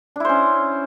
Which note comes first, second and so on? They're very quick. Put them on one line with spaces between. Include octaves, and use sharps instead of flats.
D4 E4 C5 C#4